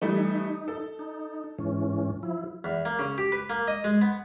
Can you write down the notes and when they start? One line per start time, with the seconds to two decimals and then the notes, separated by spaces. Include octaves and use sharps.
0.02 E3 G3 A3 D#4
0.68 A4
0.99 D#4
1.59 G#2 E3 C#4
2.23 F3 E4
2.64 E2
2.85 A#3
2.99 C#3
3.18 G4
3.32 B4
3.50 A#3
3.68 D#5
3.84 G#3
4.01 B3